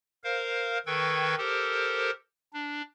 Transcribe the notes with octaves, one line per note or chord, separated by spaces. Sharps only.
A#4 C5 F5
D#3 A4 B4 G5 C#6 G#6
G4 A4 A#4 C5
D4